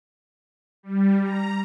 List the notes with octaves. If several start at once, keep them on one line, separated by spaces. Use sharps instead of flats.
G3
A#5